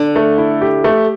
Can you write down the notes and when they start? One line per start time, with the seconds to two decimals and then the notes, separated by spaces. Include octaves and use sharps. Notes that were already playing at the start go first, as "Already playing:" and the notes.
Already playing: D3
0.16 A3
0.38 E4
0.61 G4
0.84 A3